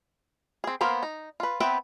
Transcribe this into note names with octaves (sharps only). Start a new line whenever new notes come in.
C4 G#4
A#3 B3 A#4 C5 F5
D#4
F4 B4
B3 C4 B4 E5 G5